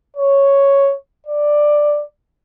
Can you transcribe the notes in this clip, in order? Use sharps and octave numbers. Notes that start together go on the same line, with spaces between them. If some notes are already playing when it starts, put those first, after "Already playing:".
C#5
D5